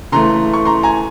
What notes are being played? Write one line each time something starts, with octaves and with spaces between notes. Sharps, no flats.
C#3 E3 A3 A#5 C6
C#6
A#5 C6
G#5 A#5